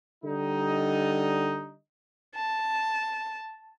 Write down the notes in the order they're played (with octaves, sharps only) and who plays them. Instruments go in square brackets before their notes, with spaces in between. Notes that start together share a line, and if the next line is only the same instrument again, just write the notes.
[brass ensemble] D3 G3 D#4
[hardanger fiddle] A5